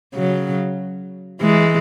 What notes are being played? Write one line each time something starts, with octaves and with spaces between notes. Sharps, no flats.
C#3 F#3
E3 G#3